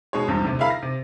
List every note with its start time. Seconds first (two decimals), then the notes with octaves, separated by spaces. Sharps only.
0.13 B2 G#3 G#4 C#5
0.28 G#1 E2 G2
0.44 D2 C3
0.59 E4 G#4 A#4 E5 F5 B5
0.70 A#6
0.83 C3